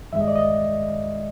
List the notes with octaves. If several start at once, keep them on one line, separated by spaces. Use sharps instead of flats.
G2 D#3 G#3 E5
D#5
D5
D#5